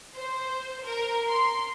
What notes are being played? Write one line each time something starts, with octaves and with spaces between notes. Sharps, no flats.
C5
A#4
C6